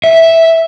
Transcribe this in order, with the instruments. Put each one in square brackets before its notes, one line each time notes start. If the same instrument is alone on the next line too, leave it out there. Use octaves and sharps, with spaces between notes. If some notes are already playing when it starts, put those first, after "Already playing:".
[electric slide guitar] E5